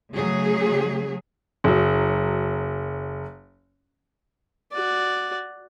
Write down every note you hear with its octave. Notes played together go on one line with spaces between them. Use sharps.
C#3 F#3 A3 G#4
F#1 F#3
F#4 D5